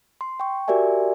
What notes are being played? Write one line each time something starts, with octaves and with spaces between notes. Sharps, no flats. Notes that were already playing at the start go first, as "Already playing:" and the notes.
C6
G5 C#6
F#4 G4 A#4 D5 E5 G#5